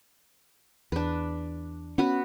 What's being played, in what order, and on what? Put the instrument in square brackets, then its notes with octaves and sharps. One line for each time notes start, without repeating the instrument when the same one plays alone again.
[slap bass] E2 [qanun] D4 B4
[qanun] B3 F#4 B4 [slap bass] C#4